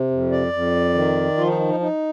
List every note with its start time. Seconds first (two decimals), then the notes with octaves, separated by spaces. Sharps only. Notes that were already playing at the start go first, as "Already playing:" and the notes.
Already playing: C3
0.11 F2
0.31 D5
0.53 F2
0.95 D#3
1.37 F3 F4
1.47 D#4
1.69 D#4
1.80 D#4